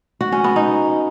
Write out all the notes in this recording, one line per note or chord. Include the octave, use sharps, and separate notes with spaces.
F#4
C#4
B3
D#4